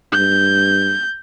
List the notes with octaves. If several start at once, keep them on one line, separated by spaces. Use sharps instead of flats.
G2 G6